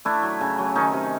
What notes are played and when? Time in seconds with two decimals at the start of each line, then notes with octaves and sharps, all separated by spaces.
0.05 A3 D4 E4
0.23 F#3
0.41 C#3
0.58 F#3
0.75 D#3 C#4 D#4
0.93 C3